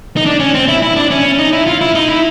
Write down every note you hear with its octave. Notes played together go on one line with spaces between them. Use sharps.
D#4
D4
C#4
C4
E4
E4
D4
C#4
D#4
E4
F4
E4
D#4
E4